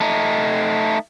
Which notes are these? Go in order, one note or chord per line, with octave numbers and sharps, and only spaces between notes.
A3 D#4